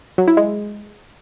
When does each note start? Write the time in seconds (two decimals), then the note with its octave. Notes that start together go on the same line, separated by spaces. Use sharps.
0.18 F#3
0.28 E4
0.37 G#3